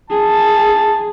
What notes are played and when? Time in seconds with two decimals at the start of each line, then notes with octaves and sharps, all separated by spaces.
0.10 G#4 A5